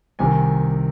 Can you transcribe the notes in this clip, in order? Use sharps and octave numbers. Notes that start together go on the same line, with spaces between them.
C2 C3 D#3 G#5